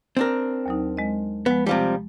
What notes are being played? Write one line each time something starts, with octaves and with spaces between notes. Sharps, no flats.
C4 D4 A#4
D#2 F#3 D#4
G#3 D#5
F3 G#3 B3
C3 F3 G3 A5 D6